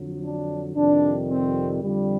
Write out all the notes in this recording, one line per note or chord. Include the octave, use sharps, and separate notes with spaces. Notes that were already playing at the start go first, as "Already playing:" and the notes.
Already playing: F2 D3 F#3
D4
F2 C3 D#3 G3 D4
C4
F2 D3 F3 G3